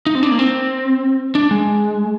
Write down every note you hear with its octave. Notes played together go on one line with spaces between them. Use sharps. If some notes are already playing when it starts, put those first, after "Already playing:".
D#4
C4
D4
A#3
C4
D4
G#3